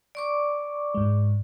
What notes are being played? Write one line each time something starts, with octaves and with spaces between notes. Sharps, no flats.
D5 C#6 D6
G#2 G#3